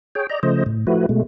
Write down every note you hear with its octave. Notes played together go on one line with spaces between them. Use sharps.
G#4 C#5 G5
D5 D#5 A#5
C#3 F3 A3 C5 D#5
A2
F3 A3 E4 F#4 B4
B2 G#3 A3